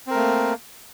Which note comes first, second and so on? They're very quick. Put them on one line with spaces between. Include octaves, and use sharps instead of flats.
C4 A#4 A3 A#3